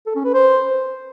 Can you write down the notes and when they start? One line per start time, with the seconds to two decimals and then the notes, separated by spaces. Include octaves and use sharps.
0.06 A4
0.16 C#4
0.25 B4
0.34 C5